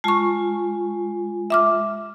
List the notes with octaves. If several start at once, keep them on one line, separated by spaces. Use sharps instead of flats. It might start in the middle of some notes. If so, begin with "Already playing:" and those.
G#3 F4 A5 C#6
E5 D6 F6